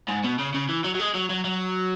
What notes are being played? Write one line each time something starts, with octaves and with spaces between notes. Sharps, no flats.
G#2
B2
C#3
C#3
E3
F#3
F#3
G#3
F#3
F#3
F#3